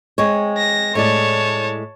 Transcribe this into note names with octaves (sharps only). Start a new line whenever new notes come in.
G#3 C4 C#5
A#6
A2 G#3 C#5 D5 A5